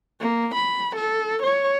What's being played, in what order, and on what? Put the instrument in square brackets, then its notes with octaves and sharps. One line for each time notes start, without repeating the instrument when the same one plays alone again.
[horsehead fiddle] A#3
B5
A4
C#5